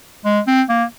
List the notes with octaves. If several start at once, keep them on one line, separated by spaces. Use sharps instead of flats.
G#3
C4
A#3